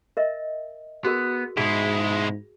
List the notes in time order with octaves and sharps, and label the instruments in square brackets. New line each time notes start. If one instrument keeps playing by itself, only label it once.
[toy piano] A#4 D#5 E5
[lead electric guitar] B3 [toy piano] F#4 G#4 A#4
[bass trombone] G#2 [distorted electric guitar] B2 G#3 [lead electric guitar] E4 [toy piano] G#4